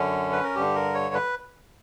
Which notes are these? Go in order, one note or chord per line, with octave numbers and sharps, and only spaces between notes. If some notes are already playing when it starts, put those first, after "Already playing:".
Already playing: F#2 D3 C#4
B4
A#4
G2 D3 G4
A#4
C#5
B4